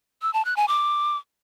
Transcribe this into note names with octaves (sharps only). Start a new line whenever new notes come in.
E6
A5
F#6
G#5
D6